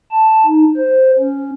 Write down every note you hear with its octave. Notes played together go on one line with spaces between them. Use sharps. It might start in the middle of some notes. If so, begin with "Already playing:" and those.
A5
D#4
C5
C#4